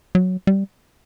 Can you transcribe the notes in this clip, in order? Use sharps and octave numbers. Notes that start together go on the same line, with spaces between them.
F#3
G3